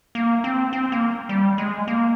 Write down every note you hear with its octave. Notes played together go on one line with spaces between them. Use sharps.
A#3
C4
C4
A#3
G3
G#3
A#3